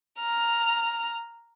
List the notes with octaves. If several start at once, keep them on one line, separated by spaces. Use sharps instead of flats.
A#5 F6